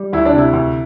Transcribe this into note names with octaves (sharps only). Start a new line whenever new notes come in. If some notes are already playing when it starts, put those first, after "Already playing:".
Already playing: G3
D2 E4
D4
C3
E4
D2